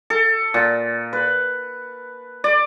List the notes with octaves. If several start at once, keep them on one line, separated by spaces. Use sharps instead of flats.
A4
A#2
B4
D5